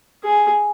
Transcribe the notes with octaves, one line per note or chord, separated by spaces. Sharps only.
G#4